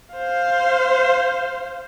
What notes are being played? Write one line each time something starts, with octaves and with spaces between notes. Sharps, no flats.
C5 F5